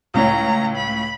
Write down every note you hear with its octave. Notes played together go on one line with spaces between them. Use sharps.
C#2 A2 C#5 A#5
B5